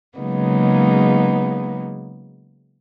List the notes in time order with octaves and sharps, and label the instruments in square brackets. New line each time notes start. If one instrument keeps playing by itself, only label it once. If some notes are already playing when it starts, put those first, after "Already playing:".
[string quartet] C#3 F#3 G#3 A#3 B3 D#4